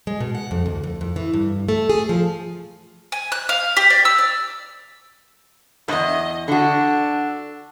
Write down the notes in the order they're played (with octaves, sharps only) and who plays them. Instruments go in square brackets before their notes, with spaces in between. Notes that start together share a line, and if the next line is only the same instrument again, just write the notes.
[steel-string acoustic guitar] G#3
B2
F#5
F2
D2
F2
F2
E3
G2
A3
G#4
F3
[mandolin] G#5
F#6
F5
G4
D5
E6
D5
[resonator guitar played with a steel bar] E2 G#2 [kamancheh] D#5
[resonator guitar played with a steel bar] D3 F#4 [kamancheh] D4